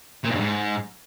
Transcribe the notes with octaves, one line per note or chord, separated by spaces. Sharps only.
A#2
G#2
G2
G#2